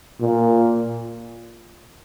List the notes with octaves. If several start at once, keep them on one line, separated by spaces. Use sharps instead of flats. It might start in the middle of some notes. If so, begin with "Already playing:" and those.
A#2